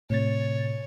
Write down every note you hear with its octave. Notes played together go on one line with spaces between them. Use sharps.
A2 C3 C#5 A6